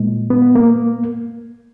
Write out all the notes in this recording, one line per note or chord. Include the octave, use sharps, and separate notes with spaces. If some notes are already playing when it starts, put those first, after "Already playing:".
Already playing: A#2 G#3
B3
A#3